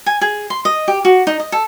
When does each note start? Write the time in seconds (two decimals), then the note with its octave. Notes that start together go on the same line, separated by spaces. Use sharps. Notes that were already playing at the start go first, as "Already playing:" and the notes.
0.06 G#5
0.21 G#4
0.50 C6
0.65 D#5
0.88 G4
1.05 F#4
1.27 D#4
1.40 D#5
1.52 A4